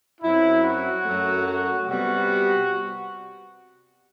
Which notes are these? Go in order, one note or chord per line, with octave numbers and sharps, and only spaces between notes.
F#2 F#3 C4 E4
F#4
F#2 F#3 A3
F#4
C3 G3 B3 F#4